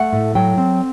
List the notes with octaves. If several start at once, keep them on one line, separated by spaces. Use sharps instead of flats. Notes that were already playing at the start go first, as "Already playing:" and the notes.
Already playing: A3 F#5
A2
F#3 G5
C4